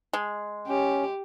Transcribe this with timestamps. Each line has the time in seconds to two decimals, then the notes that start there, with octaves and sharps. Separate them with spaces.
0.13 G#3
0.67 C#4 G4